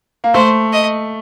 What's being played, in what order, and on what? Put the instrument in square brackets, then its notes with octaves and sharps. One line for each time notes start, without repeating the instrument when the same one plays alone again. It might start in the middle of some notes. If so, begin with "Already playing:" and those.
[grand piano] A#3
[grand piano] A3 [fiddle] C5
[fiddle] D#5